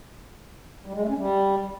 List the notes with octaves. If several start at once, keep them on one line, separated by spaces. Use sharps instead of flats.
G3
G#3
A3
C#4
G3